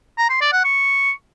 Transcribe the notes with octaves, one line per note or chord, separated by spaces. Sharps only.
A#5
C6
D5
F#5
C#6